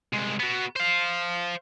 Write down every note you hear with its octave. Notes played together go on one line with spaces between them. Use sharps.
C2 G#3
B3 F#4
C5 F5